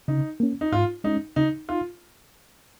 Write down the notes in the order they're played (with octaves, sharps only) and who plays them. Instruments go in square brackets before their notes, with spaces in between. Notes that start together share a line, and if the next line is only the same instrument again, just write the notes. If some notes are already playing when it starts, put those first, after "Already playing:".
[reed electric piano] C#3 [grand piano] D#4
[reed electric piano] A#3 C#4
[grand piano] D#4
[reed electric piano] G#2 [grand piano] F4
[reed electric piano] G#3 C#4 [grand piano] D#4
[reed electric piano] C#3 [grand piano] D#4
[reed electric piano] D#4 [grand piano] F4